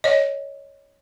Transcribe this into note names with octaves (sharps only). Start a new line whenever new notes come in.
C#5 D#5